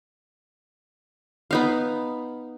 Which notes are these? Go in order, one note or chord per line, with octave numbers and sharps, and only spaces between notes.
B3 D#4 F5